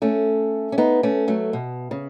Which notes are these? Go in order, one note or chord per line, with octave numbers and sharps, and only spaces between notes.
A3 C#4
C#4
B3 D#4
A3 C#4
F#3 A3
B2
C#3